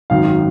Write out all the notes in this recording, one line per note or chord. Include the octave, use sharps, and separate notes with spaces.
G#1 F#2 D#3 F5